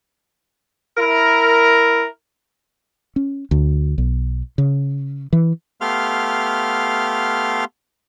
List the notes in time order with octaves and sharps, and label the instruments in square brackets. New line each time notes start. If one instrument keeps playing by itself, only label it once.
[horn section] E4 A#4
[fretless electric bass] C#4
D2
B1
C#3
E3
[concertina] A3 B3 G4 F5 C6 F6